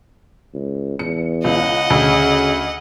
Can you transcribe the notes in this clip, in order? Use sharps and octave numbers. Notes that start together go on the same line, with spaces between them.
C#2
E2 C#7
C#2 D#5 F#5
D2 C#3